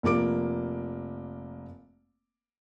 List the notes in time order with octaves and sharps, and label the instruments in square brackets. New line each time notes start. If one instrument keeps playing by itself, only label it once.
[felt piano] F1 F3 A#3 D6 D7